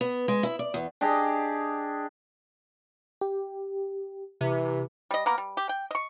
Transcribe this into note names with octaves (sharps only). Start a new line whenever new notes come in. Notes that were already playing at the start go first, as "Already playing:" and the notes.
B3
G#3
E4
D5
E2
D4 G4 G#4 D#5
G4
C3 E3
G3 D#5
A#3 B3 A#4
G3
G4
G5
D#5 C#6